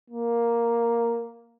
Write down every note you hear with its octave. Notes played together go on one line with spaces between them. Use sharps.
A#3